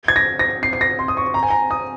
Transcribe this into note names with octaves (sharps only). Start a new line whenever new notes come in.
G#6
A#6
A#6
C7
C7
A#6
C6
D#6
C#6
A#5
G#5
A#5
D#6